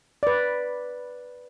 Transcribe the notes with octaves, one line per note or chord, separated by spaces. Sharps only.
B4 D5